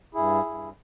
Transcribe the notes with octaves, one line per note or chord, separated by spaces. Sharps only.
G2 E4 G#4
G2